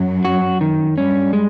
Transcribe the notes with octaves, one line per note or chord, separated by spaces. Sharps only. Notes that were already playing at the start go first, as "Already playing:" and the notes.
Already playing: F#2 F#3
F#4
D#3
G2 G3 C#4
G#3